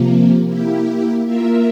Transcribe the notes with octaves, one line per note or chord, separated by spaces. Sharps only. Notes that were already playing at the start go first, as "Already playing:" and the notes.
Already playing: C3 F3 A#3
A#3 E4 G4
A#3 F4 A#4 E5